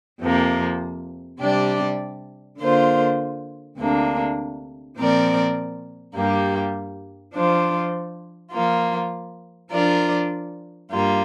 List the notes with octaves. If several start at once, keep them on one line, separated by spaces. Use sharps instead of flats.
F2 C3 F3 A#3
C3 G3 D4 G4 D5
D3 A#3 F4 C5
D2 C3 A#3 D4
A#2 F3 C4 A#4 D5
G2 G3 A#3 G4
F3 D4 F4 C5
F3 A#3 F4
F3 D4 F4 A#4 D5
G2 G3 A#3 F4